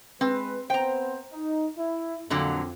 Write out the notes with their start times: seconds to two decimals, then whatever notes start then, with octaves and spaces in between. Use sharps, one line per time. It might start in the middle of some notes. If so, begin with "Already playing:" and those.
0.21 G#3 C4 B4
0.70 B3 C4 C5 G5 A#5
1.33 D#4
1.78 E4
2.30 F2 A#2 D3 F#3